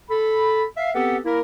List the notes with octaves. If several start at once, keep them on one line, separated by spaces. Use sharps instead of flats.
A4 B5
E5 F5
B3 C4 G4 A4 B4 F#5
A#3 E4 A#4